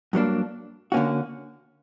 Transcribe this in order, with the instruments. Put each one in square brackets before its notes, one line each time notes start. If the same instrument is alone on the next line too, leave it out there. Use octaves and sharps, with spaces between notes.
[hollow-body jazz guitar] G2 F#3 A#3 D4
D3 A#3 C#4 F#4